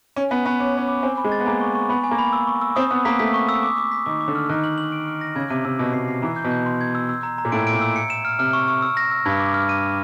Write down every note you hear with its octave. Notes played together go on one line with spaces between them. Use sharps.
C#4 G#5
B3 G#5
B3 C#6
C#4 D6
C#4 B5
D6
C4 G#5
B5
G#3
A6
B3
A#3 G#5
C#6
C#6
B3 B5
G#5
A#3
B5
E6
C#6
E6
C4 D#6
B3 D#6
A#3 B6
A3 B6
C#6
E6
D6
D6
B6
D#3 D6
D6
D3
F6
D#3 F#6
F#7
F#7
D7
F6
A#6
C#3 G#6
C3 D#7
C3 E6
B2 E6
B2 C7
C7
E3 A#5
G6
B2
G6
C6
G#6
E6
E6
A#5
A#5
A#2
A2 D7
D7
A#2
E6
C#7
E7
F6
C3 F6
C#6
C#6
E6
A#6
E6
G2 G#6
D6
F6
D#7
D6